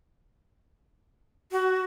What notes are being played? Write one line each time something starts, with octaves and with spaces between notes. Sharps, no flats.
F#4